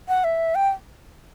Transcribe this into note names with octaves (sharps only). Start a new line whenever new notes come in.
F#5
E5
G5